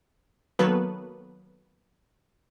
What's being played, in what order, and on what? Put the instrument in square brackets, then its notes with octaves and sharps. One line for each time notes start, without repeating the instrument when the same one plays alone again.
[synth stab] D#3 F#3 A#3 B3 A4 B4